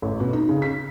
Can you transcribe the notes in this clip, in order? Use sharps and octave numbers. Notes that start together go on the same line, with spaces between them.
A1
B2
D#4
C#3
B6